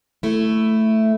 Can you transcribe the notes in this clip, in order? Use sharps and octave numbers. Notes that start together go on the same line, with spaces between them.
A3 E4